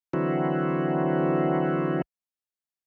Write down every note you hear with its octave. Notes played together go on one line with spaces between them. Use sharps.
D3 E3 F#3 C4 E4 F#4